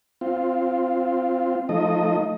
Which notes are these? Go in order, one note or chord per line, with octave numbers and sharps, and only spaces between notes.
C4 F4
F3 A3 D#4 D#5